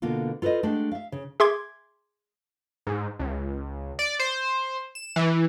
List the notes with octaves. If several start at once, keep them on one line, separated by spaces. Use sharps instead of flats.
B2 D3 A#3 B3 F4
F4 A4 B4 C5 D#5
G#3 A3 D4 G4 G#4 F#5
E5 F5
C#3
G#4 E5 C6 D6 G#6
G#2
C#2
D5
C5
E7
E3